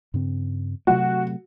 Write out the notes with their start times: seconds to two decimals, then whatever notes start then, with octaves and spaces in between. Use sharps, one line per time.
0.14 G2 C#3 C4
0.87 C3 F#3 A3 F#4